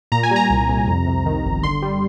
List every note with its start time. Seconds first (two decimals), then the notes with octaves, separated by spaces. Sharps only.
0.12 A#2 A#5
0.23 G#5
0.31 G3
0.36 A#5
0.50 C2
0.69 C2
0.87 F2
1.07 C3
1.26 D#3
1.45 G1
1.63 D3 C6
1.82 G3